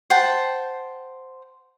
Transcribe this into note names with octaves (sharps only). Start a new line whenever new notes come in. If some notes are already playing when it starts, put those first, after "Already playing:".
C5 F#5 G5 A5